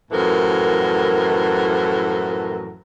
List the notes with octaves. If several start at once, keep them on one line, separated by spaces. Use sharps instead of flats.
F#2 A2 E3 F3 A4 A#4